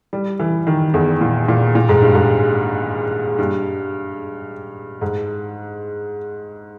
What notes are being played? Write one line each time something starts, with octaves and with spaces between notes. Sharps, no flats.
G3
E3
D#3
E2
A#2
A#2
A#2
G#2
G2
G#2
G2
G#2